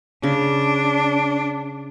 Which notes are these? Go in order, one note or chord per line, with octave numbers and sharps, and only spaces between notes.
C#3 D4